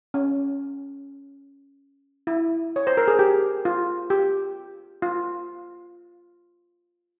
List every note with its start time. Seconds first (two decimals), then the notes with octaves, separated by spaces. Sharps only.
0.14 C#4
2.27 E4
2.76 C#5
2.87 C5
2.97 A#4
3.08 G#4
3.19 G4
3.65 F4
4.10 G4
5.02 F4